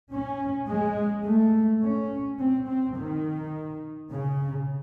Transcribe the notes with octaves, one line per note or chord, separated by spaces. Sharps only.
C#4
G#3
A3
C#4
C4
C4
D#3
C#3